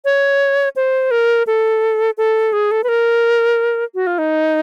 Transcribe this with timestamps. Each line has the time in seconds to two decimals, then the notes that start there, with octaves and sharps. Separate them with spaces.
0.05 C#5
0.76 C5
1.11 A#4
1.47 A4
2.18 A4
2.53 G#4
2.71 A4
2.84 B4
2.88 A#4
3.95 F#4
4.07 F4
4.18 D#4